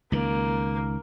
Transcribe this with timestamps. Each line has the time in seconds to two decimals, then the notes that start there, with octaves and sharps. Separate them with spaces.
0.12 C#2 D#3 A#3